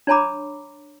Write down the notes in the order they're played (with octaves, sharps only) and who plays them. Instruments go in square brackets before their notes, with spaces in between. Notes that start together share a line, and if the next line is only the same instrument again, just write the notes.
[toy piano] D4 C#5 G#5 A#5 B5 D6